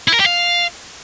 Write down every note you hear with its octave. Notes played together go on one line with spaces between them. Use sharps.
E4
A#4
G4
F5